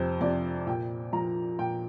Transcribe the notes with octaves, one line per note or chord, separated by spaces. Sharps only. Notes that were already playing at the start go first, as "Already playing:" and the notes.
Already playing: F2 C3 F3 C5
C3 F3 D5
A#2 G5
F3 A#5
A#2 G5